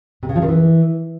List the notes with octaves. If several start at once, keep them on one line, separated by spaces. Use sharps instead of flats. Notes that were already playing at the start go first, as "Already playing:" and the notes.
C3
C#3
F3
D#3
E3